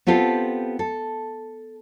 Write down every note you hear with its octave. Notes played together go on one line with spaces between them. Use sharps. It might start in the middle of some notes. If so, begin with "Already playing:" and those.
B3 C4 F4 G4 A4
A4